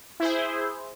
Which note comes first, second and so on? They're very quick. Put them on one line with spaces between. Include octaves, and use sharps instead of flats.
E4 C5 G#4